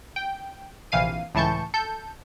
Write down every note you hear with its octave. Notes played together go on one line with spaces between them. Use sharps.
G5
A#1 C3 E3 F5 C7 D#7
C#2 A2 E3 A5 C#6 G6
A4 G6